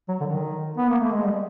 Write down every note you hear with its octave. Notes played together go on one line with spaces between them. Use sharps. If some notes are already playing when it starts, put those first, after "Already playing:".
F#3
D3
D#3
B3
A#3
A3
G#3
G3